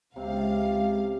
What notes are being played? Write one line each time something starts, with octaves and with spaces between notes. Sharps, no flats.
C#2 C3 F5